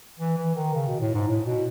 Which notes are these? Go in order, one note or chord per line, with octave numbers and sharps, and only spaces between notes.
E3
E3
D#3
C#3
B2
A2
G#2
A2
B2